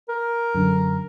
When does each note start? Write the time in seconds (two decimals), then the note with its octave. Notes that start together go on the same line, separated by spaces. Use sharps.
0.09 A#4
0.55 F#2 D3